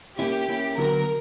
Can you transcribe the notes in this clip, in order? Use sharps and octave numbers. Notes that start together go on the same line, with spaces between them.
A#3 C#4 E4 G4
A#3 C#4 E4
D3 F#3 B3 F#4 A#4 B4